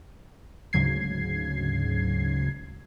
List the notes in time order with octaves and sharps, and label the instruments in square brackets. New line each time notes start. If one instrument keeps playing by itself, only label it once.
[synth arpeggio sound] D2 G#2 C#3 F#3 G#6 C7